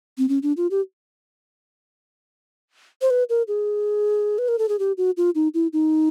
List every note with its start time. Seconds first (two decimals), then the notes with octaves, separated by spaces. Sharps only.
0.18 C4
0.29 C#4
0.43 D4
0.57 F4
0.71 G4
3.02 C5
3.10 B4
3.29 A#4
3.48 G#4
4.38 B4
4.48 A#4
4.59 A4
4.69 G#4
4.79 G4
4.98 F#4
5.17 F4
5.35 D#4
5.54 E4
5.73 D#4